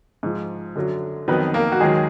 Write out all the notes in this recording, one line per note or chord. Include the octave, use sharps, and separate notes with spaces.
G#2 F3
F#2 D3 F#3
F2 D#3 F#3 B3 B4
A#3 A#4
F#4
D#2 D#3 F#3 G#3 G#4